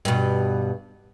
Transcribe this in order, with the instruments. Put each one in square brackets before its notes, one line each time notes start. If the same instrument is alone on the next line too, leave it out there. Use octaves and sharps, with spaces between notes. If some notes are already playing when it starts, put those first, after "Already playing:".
[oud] G2 B2